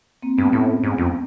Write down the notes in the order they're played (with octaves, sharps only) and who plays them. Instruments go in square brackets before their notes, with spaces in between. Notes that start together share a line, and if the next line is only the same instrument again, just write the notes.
[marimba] A#3 C4
[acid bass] G2 [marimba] A3 B3
[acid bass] A2 [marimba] B3 C#4
[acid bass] G#2
F2